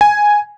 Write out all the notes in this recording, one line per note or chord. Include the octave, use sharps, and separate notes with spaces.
G#5